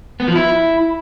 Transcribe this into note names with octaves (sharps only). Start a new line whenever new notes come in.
B3
F3
E4